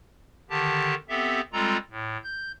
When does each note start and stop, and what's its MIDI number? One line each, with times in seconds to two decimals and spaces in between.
0.50 0.95 50
0.50 0.95 51
0.50 0.95 67
0.50 0.95 81
1.09 1.41 59
1.09 1.41 60
1.09 1.41 67
1.09 1.41 69
1.09 1.41 76
1.53 1.77 55
1.53 1.77 56
1.53 1.77 60
1.53 1.77 65
1.53 1.77 69
1.53 1.77 82
1.91 2.17 45
2.24 2.52 91